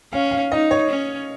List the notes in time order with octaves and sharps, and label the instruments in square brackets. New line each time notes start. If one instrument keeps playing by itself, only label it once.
[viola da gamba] C#4 [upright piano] F5
[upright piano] F5
[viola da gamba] D#4 [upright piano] D#5
[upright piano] C#5
[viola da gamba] C#4